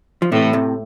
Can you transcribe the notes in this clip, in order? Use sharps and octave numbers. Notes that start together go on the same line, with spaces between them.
F3
A2 C3 E3 A3
A2 C3